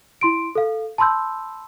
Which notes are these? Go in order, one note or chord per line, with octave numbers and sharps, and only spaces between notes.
E4 C6 D7
A4 F5
A5 B5 C6 E6 G6